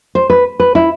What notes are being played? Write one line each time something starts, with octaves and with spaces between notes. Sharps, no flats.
C5
B4
B4
E4